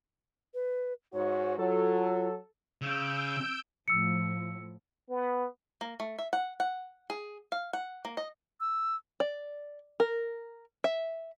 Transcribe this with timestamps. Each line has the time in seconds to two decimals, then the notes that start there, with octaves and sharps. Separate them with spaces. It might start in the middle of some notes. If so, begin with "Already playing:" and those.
0.54 B4
1.13 G#2 F#4 C#5
1.59 F#3 F4 A4
2.82 C#3 E6 G6 D7
3.88 A2 F3 E6 C#7
5.09 B3
5.81 A#3
6.00 A3
6.19 E5
6.33 F#5
6.60 F#5
7.10 G#4
7.52 F5
7.73 F#5
8.05 A#3
8.17 D#5
8.60 E6
9.20 D5
10.00 A#4
10.84 E5